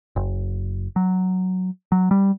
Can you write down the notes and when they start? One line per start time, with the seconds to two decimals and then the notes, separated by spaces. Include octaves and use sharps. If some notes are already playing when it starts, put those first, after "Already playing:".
0.16 F#1
0.96 F#3
1.92 F#3
2.11 G3